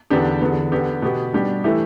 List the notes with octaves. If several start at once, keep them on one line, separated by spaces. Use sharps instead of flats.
E2 D3 B3 D4 G4
E2 D3 B3
D3 B3 G4
B2 B3 G4
B2 G3 D4 G4
E3 A3 E4 G4